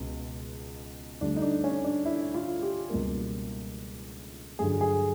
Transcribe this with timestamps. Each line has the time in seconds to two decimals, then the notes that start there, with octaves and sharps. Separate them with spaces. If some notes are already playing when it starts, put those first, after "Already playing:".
Already playing: C#2 B2 G#3 B3
1.21 D2 D3 G3 D4
1.36 D#4
1.42 D4
1.64 C#4
1.84 D4
2.05 E4
2.34 F4
2.62 G4
2.90 C#2 B2 G3 A#3
4.59 G2 D3 F#3 G#4
4.81 G#4